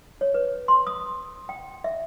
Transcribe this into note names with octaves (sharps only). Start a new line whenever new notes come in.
C#5
B4
C6
D#6
G5
E5